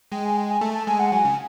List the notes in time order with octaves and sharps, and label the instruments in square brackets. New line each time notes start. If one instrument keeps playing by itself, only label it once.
[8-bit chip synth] G#3 [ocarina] G5
[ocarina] G#5
G5
G#5
[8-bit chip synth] A3 [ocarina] A5
[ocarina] A5
[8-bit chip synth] G#3 [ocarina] G#5
[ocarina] F#5
[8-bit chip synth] F#3 [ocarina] G#5
[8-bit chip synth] C#3